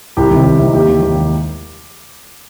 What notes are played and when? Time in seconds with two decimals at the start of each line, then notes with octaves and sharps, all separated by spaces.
0.17 C2 G4
0.31 C3 D#3
0.46 C2
0.59 C3 D#3
0.74 D#2 G4
0.89 D#3
1.02 D#2
1.17 D#3